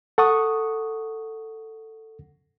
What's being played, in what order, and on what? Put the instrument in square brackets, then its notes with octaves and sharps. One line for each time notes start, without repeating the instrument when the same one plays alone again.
[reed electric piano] A4 F#5 C#6 D#6